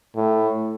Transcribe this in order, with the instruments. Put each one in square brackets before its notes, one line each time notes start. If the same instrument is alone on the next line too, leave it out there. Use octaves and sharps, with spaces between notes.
[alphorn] A2